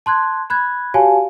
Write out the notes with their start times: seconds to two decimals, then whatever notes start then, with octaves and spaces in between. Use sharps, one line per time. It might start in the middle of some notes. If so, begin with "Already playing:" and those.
0.06 A5 C6 F#6 G#6
0.50 B5 F#6 G#6
0.94 F#4 G4 C#5 F5 G#5 A5